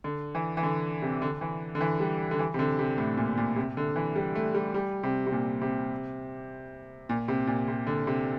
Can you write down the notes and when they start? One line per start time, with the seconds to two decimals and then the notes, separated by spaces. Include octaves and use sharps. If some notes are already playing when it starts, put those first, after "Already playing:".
0.04 D3
0.35 E3
0.57 E3
0.63 D3
1.02 C3
1.22 D3
1.41 E3
1.75 D3
1.81 E3
2.00 G3
2.31 D3
2.39 E3
2.54 C3
2.59 D3
2.79 C3
2.98 A2
3.17 A#2
3.37 A#2
3.56 C3
3.77 D3
3.96 E3
4.16 G3
4.35 A3
4.55 G3
4.74 G3
5.03 C3
5.27 C3
5.32 A#2
5.62 C3
7.09 A#2
7.28 C3
7.47 A#2
7.68 C3
7.87 D3
8.07 C3